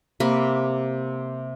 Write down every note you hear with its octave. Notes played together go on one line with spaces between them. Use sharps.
C3 A#3 B5